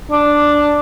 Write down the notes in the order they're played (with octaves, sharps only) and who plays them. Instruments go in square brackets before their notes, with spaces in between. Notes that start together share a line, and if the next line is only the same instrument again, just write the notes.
[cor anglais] D4